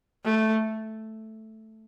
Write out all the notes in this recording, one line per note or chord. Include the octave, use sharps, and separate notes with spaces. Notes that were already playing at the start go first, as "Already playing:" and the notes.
A3